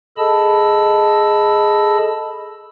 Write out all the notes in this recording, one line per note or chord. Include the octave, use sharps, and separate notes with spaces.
G#4 A4 D#5 A5 B5 E6